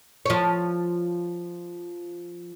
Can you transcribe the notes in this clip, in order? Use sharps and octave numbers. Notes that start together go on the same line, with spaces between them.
F3 C#5